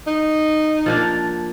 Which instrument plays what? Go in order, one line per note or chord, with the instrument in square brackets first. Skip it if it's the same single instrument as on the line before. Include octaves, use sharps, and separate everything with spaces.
[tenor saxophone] D#4
[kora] F3 A#3 D4